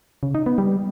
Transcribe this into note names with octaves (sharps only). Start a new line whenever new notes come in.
C#3
D#4
B3
G3